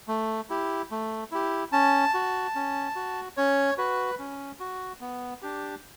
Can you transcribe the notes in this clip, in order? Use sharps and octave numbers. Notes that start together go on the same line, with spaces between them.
A3
E4 G4
A3
E4 G4
C#4 A5
F#4
C#4
F#4
C#4 C#5
F#4 B4
C#4
F#4
B3
D4 G4